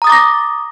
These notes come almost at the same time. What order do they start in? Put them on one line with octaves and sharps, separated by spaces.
A#5 D#6 A6 D6 A#6